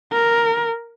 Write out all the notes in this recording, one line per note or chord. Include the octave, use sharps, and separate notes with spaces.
A#4